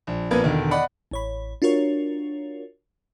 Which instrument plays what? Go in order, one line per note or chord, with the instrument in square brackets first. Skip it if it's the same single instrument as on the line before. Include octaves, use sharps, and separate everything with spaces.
[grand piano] A#1
A#1 A#3 B3 B4 G#6
E1 D3 D#3
D5 D#5 F#5 B5
[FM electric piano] A1 C#5 B5
D4 F4 F#4 A#4 C#5